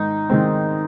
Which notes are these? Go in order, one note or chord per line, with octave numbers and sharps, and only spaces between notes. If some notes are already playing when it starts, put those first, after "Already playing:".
Already playing: G#2 D#3 D#4
D#3 G#3 C4